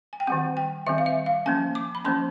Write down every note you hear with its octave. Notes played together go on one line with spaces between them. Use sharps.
G#5
G5
D#3 G3 C4 F#5
G5
D#3 G3 C4 E5
F5
E5
F5
F3 A#3 C#4 G#5
D6
B5
F3 A#3 C#4 C6